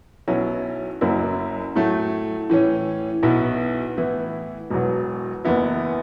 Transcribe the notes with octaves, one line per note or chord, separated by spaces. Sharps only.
B1 B2 F#3 C#4 E4
F#1 F#2 F#3 C#4 E4
A2 F#3 A3
A2 E3 C#4
B1 B2 B3 E4
A2 E3 B3 E4
E1 E2 B2 F#3
F#1 E2 E3 B3 E4